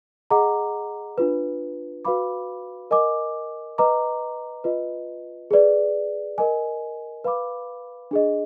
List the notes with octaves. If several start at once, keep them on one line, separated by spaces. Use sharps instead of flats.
G#4 D#5 F#5 A#5 D6
D4 F4 B4
F#4 B4 F5 B5 D6
A#4 D#5 G#5 D6
B4 D#5 A#5 D6
F4 B4 D#5
G#4 B4 D5
A#4 D#5 G#5
B4 F5 B5 D6
D4 G#4 D#5